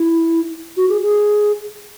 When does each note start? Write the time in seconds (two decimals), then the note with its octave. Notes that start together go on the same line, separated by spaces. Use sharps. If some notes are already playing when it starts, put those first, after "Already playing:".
Already playing: E4
0.77 F#4
0.89 G#4
1.01 G#4